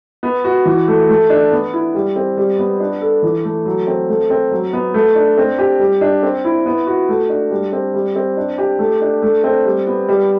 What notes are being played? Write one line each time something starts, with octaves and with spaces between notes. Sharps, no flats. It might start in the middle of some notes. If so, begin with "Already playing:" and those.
B3
F#4
E3
A3
A3
D4
B3
E4
G3
C4
G3
B3
D4
A4
E3
A3
F#3
C4
A3
C4
F#3
B3
A3
D4
C4
G4
G3
D4
C4
E4
B3
F#4
A3
D4
G3
C4
G3
C4
D4
G4
A3
D4
A3
C4
G3
B3
G3